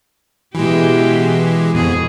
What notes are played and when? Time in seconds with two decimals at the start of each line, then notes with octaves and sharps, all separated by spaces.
0.55 B2 E3 G#3 E4 G4
1.74 F2 B2 G#4